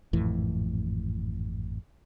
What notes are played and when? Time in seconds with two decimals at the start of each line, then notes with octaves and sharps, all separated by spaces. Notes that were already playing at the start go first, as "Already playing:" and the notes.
0.13 G#1 F2 A2 E3